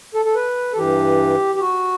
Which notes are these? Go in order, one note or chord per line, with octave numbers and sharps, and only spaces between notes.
A4
A4
B4
A4
G2 E3 G4
G4
F#4